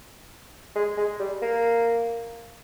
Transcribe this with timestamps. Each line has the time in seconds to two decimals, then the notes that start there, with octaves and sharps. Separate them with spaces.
0.76 G#3
0.97 G#3
1.19 G3
1.42 A#3